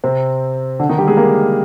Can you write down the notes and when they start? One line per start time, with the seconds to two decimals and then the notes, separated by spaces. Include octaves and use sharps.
0.04 C3 C4
0.79 D3 D4
0.89 D#3 D#4
0.98 G3 G4
1.08 G#3 G#4
1.17 A#3 A#4